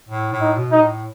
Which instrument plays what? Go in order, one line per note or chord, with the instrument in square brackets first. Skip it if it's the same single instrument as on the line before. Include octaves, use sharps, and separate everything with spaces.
[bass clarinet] A2
A2
[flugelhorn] D#4
[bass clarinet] B2
[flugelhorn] D#4
[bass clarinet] A2